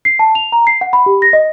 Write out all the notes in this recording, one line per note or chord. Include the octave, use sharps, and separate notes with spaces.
C7
A5
F7
A#5
C7
F#5
B5
G4
A#6
D#5